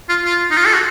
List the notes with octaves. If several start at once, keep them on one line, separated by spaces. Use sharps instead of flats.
F4
F4
D#4
F4
A4
F#4